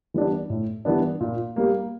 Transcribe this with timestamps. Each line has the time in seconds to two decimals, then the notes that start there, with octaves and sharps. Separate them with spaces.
0.14 E3 G3 B3 D4
0.50 A2
0.85 E3 G3 B3 D4
1.21 A#2
1.56 G3 A#3